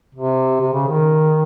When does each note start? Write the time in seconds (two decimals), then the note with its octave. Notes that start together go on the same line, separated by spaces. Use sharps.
0.15 C3
0.61 C3
0.73 C#3
0.87 D#3